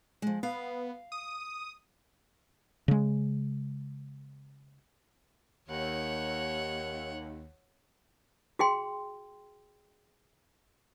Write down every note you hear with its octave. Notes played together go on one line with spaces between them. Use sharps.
F3 G#3
B3 F5
D#6
C#3 G#3
D#2 C#5 F#5
F#4 G#4 G5 C6